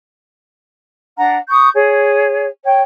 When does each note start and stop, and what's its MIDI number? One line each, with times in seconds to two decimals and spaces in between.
1.18 1.38 62
1.18 1.38 78
1.18 1.38 82
1.49 1.68 85
1.49 1.68 87
1.49 1.68 91
1.74 2.47 68
1.74 2.47 73
2.64 2.81 73
2.64 2.81 79